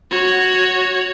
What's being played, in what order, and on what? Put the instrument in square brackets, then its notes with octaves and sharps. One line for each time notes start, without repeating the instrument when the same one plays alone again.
[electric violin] F#4 C#5